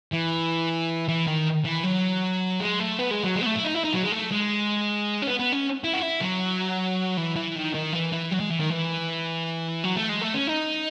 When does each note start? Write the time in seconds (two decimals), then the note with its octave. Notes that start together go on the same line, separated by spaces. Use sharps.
0.13 E3
1.08 E3
1.27 D#3
1.65 E3
1.83 F#3
2.60 G#3
2.80 A3
2.99 B3
3.11 G#3
3.24 F#3
3.36 G#3
3.41 B3
3.46 A3
3.56 E4
3.64 D#4
3.75 E4
3.84 D#4
3.94 F#3
4.03 G#3
4.12 A3
4.32 G#3
5.22 C#4
5.27 B3
5.39 B3
5.52 C#4
5.84 E4
5.93 F#4
6.02 E4
6.21 F#3
7.17 E3
7.36 E3
7.56 D#3
7.75 D#3
7.93 E3
8.13 E3
8.32 F#3
8.40 G#3
8.51 E3
8.60 D#3
8.70 E3
9.84 F#3
9.96 A3
10.09 G#3
10.21 A3
10.34 C#4
10.47 D#4